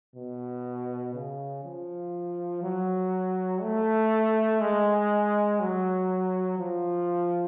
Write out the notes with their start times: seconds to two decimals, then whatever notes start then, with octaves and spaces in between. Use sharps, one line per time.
0.16 B2
1.14 C#3
1.65 F3
2.63 F#3
3.62 A3
4.61 G#3
5.60 F#3
6.59 F3